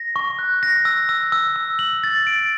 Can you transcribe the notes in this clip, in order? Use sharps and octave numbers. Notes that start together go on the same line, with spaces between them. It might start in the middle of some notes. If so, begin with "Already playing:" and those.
Already playing: A#6
C#6
F#6
A#6
E6
E6
E6
E6
F#7
A6
D7